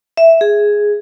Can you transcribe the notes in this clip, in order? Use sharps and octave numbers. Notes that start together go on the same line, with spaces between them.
E5
G#4